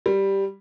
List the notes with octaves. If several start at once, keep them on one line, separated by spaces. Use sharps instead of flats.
G3